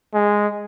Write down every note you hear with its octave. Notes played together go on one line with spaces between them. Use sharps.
G#3